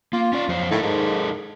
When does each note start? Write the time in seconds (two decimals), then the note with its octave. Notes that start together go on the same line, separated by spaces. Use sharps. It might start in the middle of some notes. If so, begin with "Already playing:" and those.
0.13 A#3 F4
0.33 C#4 D5
0.49 F2 F#3 C5
0.71 A2 D#4 A4 A#4
0.83 G#2